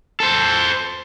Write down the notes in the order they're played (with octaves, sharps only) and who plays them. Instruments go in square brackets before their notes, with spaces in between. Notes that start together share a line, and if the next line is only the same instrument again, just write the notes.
[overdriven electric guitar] A4 C5